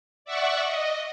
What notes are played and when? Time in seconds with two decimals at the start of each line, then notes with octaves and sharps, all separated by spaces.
0.25 D5 E5 F#5 C#6
0.63 D#5